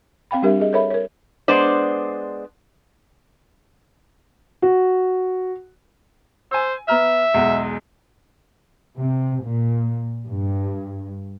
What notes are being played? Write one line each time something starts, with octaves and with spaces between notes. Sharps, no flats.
C4 F5 G5 B5
G3 D4 G4 A#4 E5
G#4 D#5
A4 A#4 C#5 E5 B5
A#4 C#5
G#3 B3 D4 C5 D5
F#4
C5 G#5 E6
B3 E5 A#5 F6
B1 E2 G#3
C3
A#2
G2